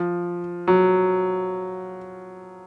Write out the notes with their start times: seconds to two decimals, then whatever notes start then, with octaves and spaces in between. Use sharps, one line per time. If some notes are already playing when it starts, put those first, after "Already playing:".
Already playing: F3
0.68 F#3